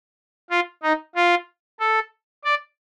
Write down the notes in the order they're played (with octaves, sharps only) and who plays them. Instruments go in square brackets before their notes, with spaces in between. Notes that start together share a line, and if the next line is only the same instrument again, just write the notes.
[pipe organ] F4
D#4
F4
A4
D5